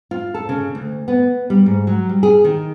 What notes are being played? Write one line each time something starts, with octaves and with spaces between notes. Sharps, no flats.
F4
A4
C#3
D2
B3
G3
G#2
F#3
G3
G#4
D#3